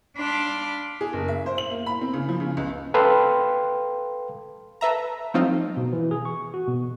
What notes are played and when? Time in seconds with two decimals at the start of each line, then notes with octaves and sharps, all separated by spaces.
0.19 D4 F5 B5 C6 D6 F6
1.01 G#4
1.13 F#1
1.28 E5
1.46 C5
1.58 F#7
1.70 A#3
1.87 B5
2.01 C4
2.14 C#3
2.29 F3
2.40 C#3
2.57 C#2
2.94 A4 B4 F5 G5 C6
4.81 A4 B4 E5 A#5
5.34 F3 F#3 A3 C4 D#4 F4
5.77 B2
5.93 E3
6.11 G#4
6.25 C#6
6.54 F#4
6.68 B2